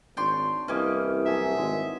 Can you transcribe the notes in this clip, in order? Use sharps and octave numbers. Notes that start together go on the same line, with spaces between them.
G#1 D4 C#5 G5 C6
C2 E3 A#3 C#4 G4 D#5
F#3 G#4 A4 E5
G#1 G#3